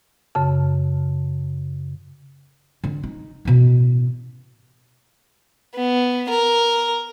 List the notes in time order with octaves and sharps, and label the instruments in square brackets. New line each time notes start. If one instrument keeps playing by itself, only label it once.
[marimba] F#2 C#3 A5
[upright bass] D3
D#4
A1 B2
[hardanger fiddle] B3
A#4